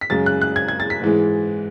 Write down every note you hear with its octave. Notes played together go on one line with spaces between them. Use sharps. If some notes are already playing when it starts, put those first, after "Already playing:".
B6
F#2 C#3 G#3 A6
F#6
F#6
G#6
G#6
A6
B6
G#2 E3 G#3